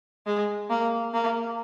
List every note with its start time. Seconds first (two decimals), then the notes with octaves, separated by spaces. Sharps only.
0.26 G#3
0.70 A#3
1.13 A#3